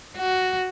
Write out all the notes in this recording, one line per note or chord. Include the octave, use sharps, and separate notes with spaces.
F#4